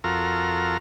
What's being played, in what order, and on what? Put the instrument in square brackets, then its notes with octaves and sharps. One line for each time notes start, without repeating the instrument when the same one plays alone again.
[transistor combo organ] F2 F4 F#4 A4 A#4 A#5